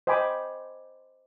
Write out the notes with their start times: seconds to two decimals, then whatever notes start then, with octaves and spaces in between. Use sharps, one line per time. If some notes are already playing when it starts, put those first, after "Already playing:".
0.07 C5 D#5 G5 G#5 B5 D6